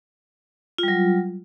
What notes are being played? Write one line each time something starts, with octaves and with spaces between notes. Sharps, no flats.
F#3 G3 F4